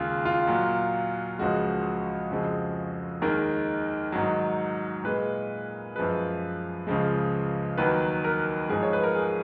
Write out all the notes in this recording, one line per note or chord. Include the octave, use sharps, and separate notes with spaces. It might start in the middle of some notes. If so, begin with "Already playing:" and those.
Already playing: D#2 C#3 G#3 F4 G#4
F4
A#2 F#3
C#2 C#3 F3 G#3 F#4
F2 C#3 F3 G#3
D#2 D#3 G#3 A#4
G#2 D#3 F#3
A#2 G#3 B4
F#2 F3 G#3 B4
C#2 C#3 F3 G#3
D#2 D#3 F#3 B4
A#4
G#2 F3 G#3 G#4
C#5
B4
A#4
G#4